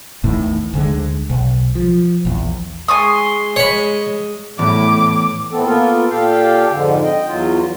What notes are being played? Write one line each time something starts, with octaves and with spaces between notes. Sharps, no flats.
A1 E2 A2 D#3
D2 D3 G#3
B1
F3
A#1 E2
G#3 G#5 C6 C#6 D#6
G#3 C#5 D#5 B5
E2 A2 D6
A2 E3 B3 C4 A4
A#3 B3 F4 A4 A#4
A#2 G4 A4 F5 G5
F2 G#2 D3
D#5 G5
E2 F#3 F4